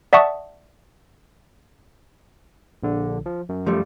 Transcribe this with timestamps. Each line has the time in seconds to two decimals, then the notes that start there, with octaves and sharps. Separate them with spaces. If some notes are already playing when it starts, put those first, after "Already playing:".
0.13 D5 E5 F#5 A5 C#6 D#6
2.83 A#1 D3
3.26 F3
3.49 F#2
3.66 F3 G3 A3